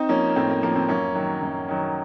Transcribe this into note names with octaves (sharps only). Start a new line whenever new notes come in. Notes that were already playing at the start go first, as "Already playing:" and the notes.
Already playing: C4 D#4
F3 A#3 C#4
A#3
A2 C4
A#3
F3 A#3
C4
F#2 A#3 C#4
D#3 F#3
F#2
D#3 F#3